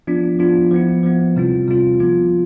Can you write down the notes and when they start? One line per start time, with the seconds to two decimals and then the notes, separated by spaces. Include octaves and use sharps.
0.07 F3 B3 D4 F4
0.39 F3 B3 D4 F4
0.71 F3 B3 E4
1.03 F3 B3 E4
1.36 C3 G3 C4 F4
1.68 C3 G3 C4 F4
2.00 F3 B3 F4